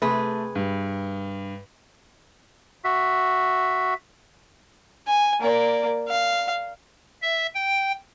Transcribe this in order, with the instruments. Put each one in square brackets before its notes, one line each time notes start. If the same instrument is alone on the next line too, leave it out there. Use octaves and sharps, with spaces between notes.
[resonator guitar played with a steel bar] C3 G#4 B4 [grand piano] A3
[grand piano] G2
[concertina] F#4 E5
[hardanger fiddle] G#5
A#3 D5
F5
[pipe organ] E5
G5